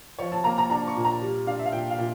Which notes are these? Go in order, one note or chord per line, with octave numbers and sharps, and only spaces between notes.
F3 C#5
A5
A#3 A#5
A#5
D4 A#5
C#6
A#2
A#5
G3
D4 F5
E5
F5
A#2 G5
F5
A#2